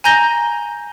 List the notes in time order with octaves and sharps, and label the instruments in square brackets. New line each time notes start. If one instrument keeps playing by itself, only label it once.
[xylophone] G#5 A#5 G6 A#6 G7